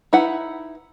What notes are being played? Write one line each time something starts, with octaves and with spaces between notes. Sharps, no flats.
D#4 E4 B4 F#5